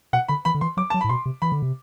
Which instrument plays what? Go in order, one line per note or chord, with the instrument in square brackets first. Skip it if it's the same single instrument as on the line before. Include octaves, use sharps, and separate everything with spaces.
[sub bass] B2 [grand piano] F#5
[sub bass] D3 [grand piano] B5
[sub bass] E3 [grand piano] B5
[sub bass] D3
[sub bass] E3 [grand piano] C6
[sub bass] F#3 [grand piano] D6
[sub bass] F#3 [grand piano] A5
[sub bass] A2 [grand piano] B5
[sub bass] B2 [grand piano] C6
[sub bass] C3
[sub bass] E3 [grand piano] B5
[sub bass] D3
C3